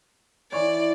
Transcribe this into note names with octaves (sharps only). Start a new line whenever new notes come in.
E3 C#5 D5